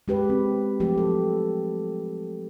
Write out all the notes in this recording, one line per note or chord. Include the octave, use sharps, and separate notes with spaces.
G#3 G4 B4
C4
F3 F#3 A3 G4
A4